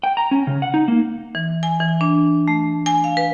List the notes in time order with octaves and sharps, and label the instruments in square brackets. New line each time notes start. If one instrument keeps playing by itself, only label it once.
[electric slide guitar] G5
A#5
C#4
C#3
F#5
D#4
A#3
[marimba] E3
G#5
E3
D4
A3
G#5
F5
B4